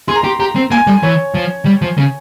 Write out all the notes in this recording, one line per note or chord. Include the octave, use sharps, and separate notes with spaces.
G#4 C6
A#5
G4 C6
G4 A#5
C4
A#3 G#5
G3
E3 C#5
F3
G3
F3
C#3